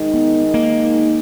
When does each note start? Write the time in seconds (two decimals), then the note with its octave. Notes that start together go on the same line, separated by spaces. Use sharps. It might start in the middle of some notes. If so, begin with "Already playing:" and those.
Already playing: D#3 G#3 D#4
0.14 B3
0.54 A#3